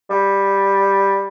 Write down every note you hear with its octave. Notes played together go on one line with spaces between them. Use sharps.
G3